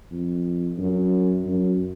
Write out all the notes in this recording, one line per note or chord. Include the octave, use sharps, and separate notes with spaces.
F2
F#2
F#2